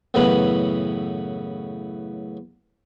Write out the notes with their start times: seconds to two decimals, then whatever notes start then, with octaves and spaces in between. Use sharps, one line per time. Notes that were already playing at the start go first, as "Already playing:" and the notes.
0.14 F#2 A2 C#3 E3 B3 B5